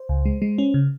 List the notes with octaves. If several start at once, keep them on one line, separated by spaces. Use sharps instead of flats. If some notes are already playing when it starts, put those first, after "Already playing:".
Already playing: C5
C#2
G#3
G#3
C#4
C#3